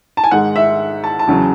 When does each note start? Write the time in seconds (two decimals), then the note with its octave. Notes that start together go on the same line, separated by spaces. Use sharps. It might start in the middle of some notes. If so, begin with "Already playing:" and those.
0.17 A5
0.24 G#5
0.31 G#2 D#3 G#3 F#5
0.56 E5
1.04 A5
1.19 A5
1.27 E2 C#3 F#3